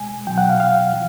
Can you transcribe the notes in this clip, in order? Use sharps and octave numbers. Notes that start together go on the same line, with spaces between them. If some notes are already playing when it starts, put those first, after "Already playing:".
Already playing: E2 B2 G#3 G#5
C#2 B2 F#3 G5
F#5
F5
F5
F3